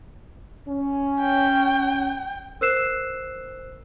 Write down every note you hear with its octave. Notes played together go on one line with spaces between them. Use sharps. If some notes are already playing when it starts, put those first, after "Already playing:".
C#4
G5
A#4 C5 E6 F#6 C7 E7